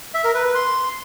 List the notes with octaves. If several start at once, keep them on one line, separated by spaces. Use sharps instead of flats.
E5
A#4
B4
B4
C6